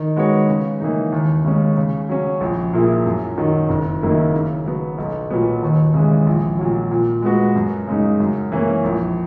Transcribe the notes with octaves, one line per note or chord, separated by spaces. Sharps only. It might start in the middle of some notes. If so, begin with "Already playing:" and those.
Already playing: D#3
G#3 B3 F#4 C#5
C#3
E3 A#3 D#4
D#2
C#3 G#3 C#4
C#3
F#3 C#4
A#1
A#2 A#3 E4 G#4
F#2
D#3 F#3
F#1
F#2 D#3 A#3 E4
C#3
F#3 B3
B1
A#2 F#3 B3
D#2
C#3 E3 G#3
A#1
A#2 F#3
A#2
G#3 B3 F#4
F#2
C#3 G#3 D#4
F#2
E3 A#3 C#4
A#1